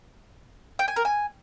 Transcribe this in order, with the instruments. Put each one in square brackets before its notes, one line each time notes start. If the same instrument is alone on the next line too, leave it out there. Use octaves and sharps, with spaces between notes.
[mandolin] G5
G#5
A#4
G#5